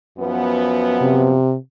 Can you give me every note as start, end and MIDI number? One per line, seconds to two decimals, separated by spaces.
0.19 1.36 42
0.19 1.36 53
0.19 1.36 59
1.01 1.56 48